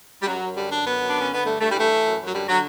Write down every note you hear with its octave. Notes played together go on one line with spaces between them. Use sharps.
G3
F#2 F#3
F#2
D3 G3
D3 D4
F#2 B3
F#2
D4
D3
C#4
D3 B3
G2 A3
G2 A3
G3
E3 A3
E3
F#2
F#2
F#3
D3 G3
D3 F#3